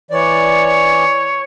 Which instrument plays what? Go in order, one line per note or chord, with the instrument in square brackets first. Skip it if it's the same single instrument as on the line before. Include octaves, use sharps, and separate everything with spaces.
[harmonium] E3 D5 [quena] C#5